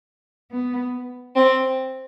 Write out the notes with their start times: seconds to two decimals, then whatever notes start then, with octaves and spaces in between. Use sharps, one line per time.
0.51 B3
1.36 C4